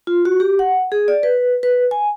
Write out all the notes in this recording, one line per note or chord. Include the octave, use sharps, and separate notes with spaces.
F4
F#4
G4
F#5
G#4
D5
B4
B4
G#5